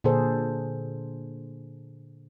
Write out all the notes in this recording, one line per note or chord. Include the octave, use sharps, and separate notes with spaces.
A#2 D3 G#4 A4 C5